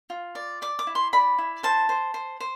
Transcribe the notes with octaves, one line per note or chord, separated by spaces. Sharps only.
F4
D5
D5 D6
D6
E4
C6
D5 B5
E4
C5 A5
C5
C5
C5